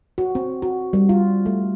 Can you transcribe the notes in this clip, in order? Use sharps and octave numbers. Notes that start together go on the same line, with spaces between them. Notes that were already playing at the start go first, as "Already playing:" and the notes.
F#4
C4
F#4
G3
F4
A3